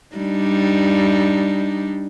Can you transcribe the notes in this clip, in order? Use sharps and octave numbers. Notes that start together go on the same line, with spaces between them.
G3 D4 D#4